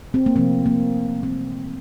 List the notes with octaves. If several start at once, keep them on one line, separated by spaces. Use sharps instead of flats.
C4
A#3
C3 F3 A3 C4
A#3
E3 G3 A#3 C4